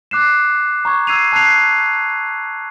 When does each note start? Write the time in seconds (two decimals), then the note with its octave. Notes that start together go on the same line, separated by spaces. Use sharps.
0.11 D6 F#6 C7 E7
0.85 A#5 C#6 G#6
1.07 E6 G#6 C7 D#7 F7
1.33 A5 F6 F#6 G#6 C7 F7